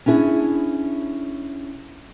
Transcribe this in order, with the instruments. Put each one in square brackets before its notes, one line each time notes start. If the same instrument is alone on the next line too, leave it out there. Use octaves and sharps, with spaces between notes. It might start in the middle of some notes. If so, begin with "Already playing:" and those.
[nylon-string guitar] C#4 D4 E4 G#4